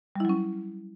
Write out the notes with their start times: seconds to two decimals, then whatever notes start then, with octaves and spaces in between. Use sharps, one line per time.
0.16 G3
0.20 E4
0.25 F#3
0.29 C#4